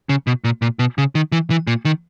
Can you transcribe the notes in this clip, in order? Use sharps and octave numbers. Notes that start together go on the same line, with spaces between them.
C#3
B2
A#2
A#2
B2
C#3
D#3
E3
E3
A#2
D#3